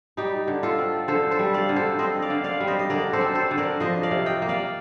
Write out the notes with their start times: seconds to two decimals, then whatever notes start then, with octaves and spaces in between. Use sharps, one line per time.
0.17 G3 D#4 G4
0.47 D3
0.63 F4 A4
0.78 C4
1.08 D3 A4 C5
1.31 A4 C5
1.39 G3
1.54 D5 F5
1.69 D3
1.76 A4 C5
1.99 C4 C5 D#5
2.22 D5 F5
2.30 D3
2.44 D5 F5
2.60 G3
2.67 C5 D#5
2.79 D#5
2.90 D3 A#4 D5
3.13 A4 C5
3.21 C4
3.35 A4 C5
3.51 D3
3.58 A#4 D5
3.80 F3 C5 D#5
4.03 D5 F5
4.11 C3
4.26 D#5 G5
4.42 A#3
4.49 D5 F5